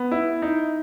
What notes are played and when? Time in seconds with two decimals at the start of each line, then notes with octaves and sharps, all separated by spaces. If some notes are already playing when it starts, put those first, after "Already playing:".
Already playing: B3
0.12 E4
0.42 D#4